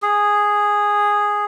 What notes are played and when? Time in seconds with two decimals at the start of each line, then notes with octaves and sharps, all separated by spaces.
0.02 G#4